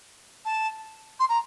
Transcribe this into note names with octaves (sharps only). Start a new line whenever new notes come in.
A5
C6
A#5